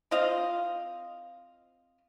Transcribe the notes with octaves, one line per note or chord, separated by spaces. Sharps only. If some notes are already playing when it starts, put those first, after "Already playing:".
C4 F4 D#5 F5